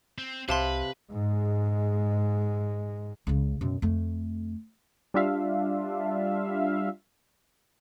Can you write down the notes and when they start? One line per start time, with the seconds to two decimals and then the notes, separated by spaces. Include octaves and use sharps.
0.18 C4
0.49 C2 C3 B4 F5 A5 C6
1.12 G#2 G#3
3.27 C#2 C#3
3.61 F#2 B2
3.82 F2 A3
5.14 G3 D4 F4 E5 F5